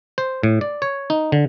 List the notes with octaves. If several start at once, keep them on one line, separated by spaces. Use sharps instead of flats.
C5
A2
D5
C#5
D#4
D3